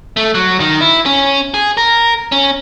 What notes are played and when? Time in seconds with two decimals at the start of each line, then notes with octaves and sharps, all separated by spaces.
0.17 A3
0.35 F#3
0.60 D#3
0.81 E4
1.06 C#4
1.54 G#4
1.77 A#4
2.32 C#4